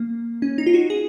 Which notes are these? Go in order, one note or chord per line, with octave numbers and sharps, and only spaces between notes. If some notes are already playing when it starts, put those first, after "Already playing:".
Already playing: A#3
C#4
D#4
F4
F#4
G#4